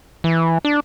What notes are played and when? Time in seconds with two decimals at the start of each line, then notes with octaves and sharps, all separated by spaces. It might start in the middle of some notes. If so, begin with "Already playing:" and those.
0.24 E3
0.65 D4